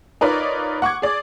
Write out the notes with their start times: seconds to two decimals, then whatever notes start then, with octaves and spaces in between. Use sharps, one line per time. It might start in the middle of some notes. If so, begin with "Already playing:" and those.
0.21 D#4 F4 A#4 B4 C#5 D5
0.82 F#5 C#6 D6 G#6
1.02 G#4 D5 D6